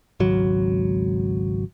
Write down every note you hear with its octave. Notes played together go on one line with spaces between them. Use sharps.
G#1 C#2 F#3